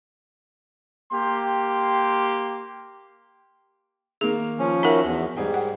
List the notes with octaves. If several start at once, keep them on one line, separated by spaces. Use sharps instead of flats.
A#3 G4 C6
D#3 A#3 G#4
F3 C#4
D#4 F#4 A#4 E5
E2
G#2 G3 G#4 G5
F#5